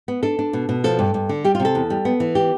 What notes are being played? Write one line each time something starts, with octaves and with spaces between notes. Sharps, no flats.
B3
D4 A4
D4
B2
B2
F3 A4
G2
G2
D3
G3 G4
F4
C3
A4
E2
G3
B3
E3
G4